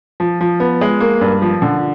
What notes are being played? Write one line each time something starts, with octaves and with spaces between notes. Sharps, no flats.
F3
F3
B3
G#3
A#3
G2
F3
D3